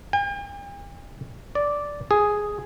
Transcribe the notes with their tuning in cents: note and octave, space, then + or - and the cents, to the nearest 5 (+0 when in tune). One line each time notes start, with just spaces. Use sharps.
G5 +45
D5 -5
G#4 +0